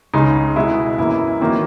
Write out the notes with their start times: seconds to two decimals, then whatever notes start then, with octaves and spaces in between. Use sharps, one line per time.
0.14 C#2 C#3 G#3 D#4
0.56 B2 G#3 B3 E4
0.98 F#2 E3 A#3 E4
1.40 E2 D#3 F#3 A#3